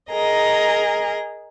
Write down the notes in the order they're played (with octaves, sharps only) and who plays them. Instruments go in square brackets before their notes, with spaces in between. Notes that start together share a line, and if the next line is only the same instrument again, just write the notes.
[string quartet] G#4 A#4 D#5 A#5